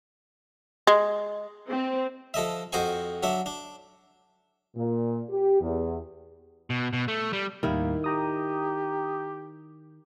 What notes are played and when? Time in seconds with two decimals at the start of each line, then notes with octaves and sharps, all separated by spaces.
0.87 G#3
1.69 C4
2.34 F3 A4 D#5 E5
2.73 F2 F#4 C5 D#5 G#5 C#6
3.23 F#3 D4 E5
3.46 D4
4.76 A#2
5.29 G4
5.61 E2
6.70 B2
6.93 B2
7.08 A3
7.33 G3
7.63 D#2 A2 D#3 G3 A#3 E4
8.04 G4 G5 A#5 D#6